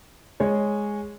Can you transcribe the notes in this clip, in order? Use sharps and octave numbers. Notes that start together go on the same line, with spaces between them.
G#3 G#4 C#5